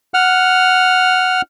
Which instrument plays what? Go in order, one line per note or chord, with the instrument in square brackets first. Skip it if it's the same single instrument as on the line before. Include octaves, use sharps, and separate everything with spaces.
[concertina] F#5 F6